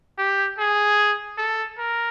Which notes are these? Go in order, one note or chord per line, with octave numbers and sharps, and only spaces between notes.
G4
G#4
A4
A#4